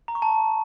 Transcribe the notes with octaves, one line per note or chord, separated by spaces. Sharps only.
A#5
C#6
A5